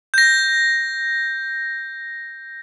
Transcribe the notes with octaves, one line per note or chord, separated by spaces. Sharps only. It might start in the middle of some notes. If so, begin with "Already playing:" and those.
G6 A#6